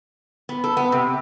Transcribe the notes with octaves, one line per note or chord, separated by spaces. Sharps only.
B3
A4
B3
C3